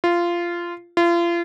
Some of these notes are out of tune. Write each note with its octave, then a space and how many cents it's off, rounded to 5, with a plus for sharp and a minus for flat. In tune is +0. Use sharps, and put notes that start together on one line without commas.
F4 -15
F4 -35